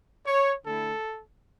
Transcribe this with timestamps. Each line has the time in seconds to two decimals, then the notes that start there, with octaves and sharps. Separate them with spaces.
0.26 C#5
0.65 D3 A3 E4 A4